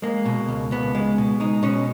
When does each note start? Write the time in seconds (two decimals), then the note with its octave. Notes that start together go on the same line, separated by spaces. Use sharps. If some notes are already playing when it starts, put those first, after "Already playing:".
0.02 G#3 A#3
0.25 B2
0.48 C#2
0.71 C#2 B3
0.95 G#3
1.18 B2
1.40 G#3 D#4
1.63 B2 C#4